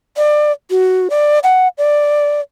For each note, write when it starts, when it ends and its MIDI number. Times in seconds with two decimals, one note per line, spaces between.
0.17 0.52 74
0.70 1.08 66
1.10 1.39 74
1.43 1.68 78
1.78 2.40 74